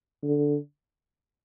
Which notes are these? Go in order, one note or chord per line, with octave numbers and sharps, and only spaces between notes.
D3